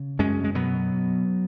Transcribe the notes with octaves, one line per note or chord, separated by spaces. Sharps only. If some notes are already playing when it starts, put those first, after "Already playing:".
Already playing: C#3
F#2 G#3 C#4
G#3
B2 F#3 B3